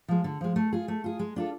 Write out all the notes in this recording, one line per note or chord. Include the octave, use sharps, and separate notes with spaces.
F3 G#3
D3
F3 G#3
A3
F4 G#4
A3
F4 G#4
G#3
D4 F4 A4